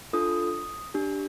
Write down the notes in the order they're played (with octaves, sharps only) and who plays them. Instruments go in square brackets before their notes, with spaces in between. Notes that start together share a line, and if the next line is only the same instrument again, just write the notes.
[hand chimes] D4 F4 A4 D#6
D4 G4